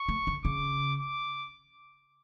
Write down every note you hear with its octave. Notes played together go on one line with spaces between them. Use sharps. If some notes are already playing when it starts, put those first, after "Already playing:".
Already playing: C#6
A3
D3
C#3 D6
D6